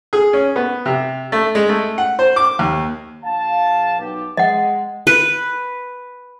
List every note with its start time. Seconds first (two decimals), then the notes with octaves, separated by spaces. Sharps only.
0.13 G#4
0.33 C#4
0.56 B3
0.86 C3
1.32 A3
1.55 G#3
1.69 A3
1.98 F#5
2.19 C5
2.36 D6
2.59 D#2
3.24 A#1 F5 A5
3.99 B1 B3 G4
4.37 G#3 D#5 F#5
5.07 B4